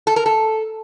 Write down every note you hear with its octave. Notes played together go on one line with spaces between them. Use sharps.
A4
A#4
A4